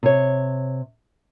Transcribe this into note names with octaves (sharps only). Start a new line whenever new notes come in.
C3 C#5